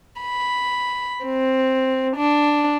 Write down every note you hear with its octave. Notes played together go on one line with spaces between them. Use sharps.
B5
C4
D4